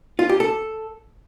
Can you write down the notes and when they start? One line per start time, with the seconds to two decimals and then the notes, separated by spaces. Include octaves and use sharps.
0.19 F4
0.29 G4
0.40 A4